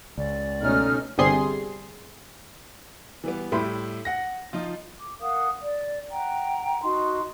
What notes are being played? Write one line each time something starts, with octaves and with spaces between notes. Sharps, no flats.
C#2 D5
B2 A3 C#4 D#4 F6
G1 C3 G3 G#4 C6 C7
E3 G3 B3
A2 G3 E4 G4 B5 C6
F#5 A#6
F3 D#4 F4
D6
A#4 F5 F#5 D#6
D5
F#5 G5 A#5
D#4 F#4 C6